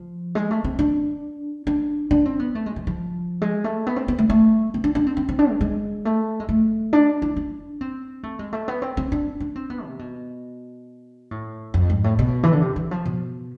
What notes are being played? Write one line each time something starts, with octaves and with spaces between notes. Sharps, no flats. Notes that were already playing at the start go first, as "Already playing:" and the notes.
Already playing: F3
G#3
A3
C4
D4
D4
D4
C4
B3
A3
G#3
F3
F3
G#3
A3
B3
C4
B3
A3
A3
B3
D4
D4
C4
C4
C4
D4
G#3
G#3
A3
G#3
A3
D4
E4
D4
C4
A3
G#3
A3
B3
C4
C4
D4
D4
C4
B3
C3
B2
A2
F2
G#2
A2
B2
E3
D3
C3
E3
F3
B2